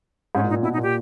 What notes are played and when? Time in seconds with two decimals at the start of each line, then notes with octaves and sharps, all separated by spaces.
0.35 G#2 C#4
0.44 A#2
0.49 D#4
0.54 A#2
0.63 B2 E4
0.73 D#4
0.78 A#2 G4